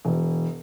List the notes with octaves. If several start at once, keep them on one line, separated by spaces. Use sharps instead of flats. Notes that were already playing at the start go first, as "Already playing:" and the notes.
E1